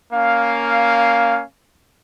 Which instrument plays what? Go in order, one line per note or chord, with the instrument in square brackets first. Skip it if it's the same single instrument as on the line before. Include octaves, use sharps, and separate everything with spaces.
[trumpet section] A#3 C#4 F5